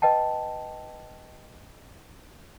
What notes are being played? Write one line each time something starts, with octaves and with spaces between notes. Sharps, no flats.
B4 D#5 G5 A5